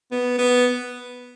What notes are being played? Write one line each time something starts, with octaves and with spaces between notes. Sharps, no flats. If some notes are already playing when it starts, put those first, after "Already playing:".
B3
B3